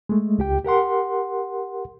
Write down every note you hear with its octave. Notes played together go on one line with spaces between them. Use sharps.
G#3 A3
C#2 G4 G5
G4 A#4 F#5 C6